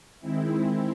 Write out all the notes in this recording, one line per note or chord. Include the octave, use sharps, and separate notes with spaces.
D#3 G#3 C4 E4